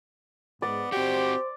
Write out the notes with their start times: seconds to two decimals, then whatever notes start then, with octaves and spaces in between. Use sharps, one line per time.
0.62 G#2 B3 D5
0.92 C4 F#4 G4 C5